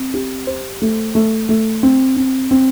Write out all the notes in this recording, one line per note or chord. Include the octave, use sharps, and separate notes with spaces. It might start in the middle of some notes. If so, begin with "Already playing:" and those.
Already playing: C4
G4
C5
A3
A3
A3
C4
C4
C4